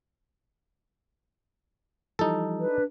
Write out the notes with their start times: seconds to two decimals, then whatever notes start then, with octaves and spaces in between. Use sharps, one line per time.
2.19 E3 F3 G3 D#4 A4
2.58 D4 B4